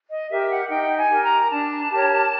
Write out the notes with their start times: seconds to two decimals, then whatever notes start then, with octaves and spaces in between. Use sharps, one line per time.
0.09 D#5
0.30 G4 A#4 E5
0.50 F#5
0.69 D#4 G5
0.96 G#5
1.09 G4 A#4
1.23 A#5
1.49 D4 A5
1.89 G4 A#4 C#5